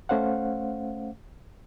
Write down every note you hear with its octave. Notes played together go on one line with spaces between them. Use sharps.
A3 C#4 C5 F5 F#5